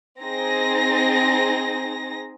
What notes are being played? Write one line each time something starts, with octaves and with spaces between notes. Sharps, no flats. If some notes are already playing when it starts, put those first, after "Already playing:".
C4 D#4 G#4 A#6